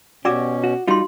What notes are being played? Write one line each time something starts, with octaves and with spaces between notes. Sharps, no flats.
B2 C#4 F#4 G4 D5 D6 E6
F#4
G3 D#4 F4 F#4 C6